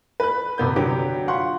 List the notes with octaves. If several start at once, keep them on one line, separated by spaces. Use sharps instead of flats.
B4 F#6
D#1 C3 B3 G6
D3 F#3 G4 D6
F4 F#5 C6 C#6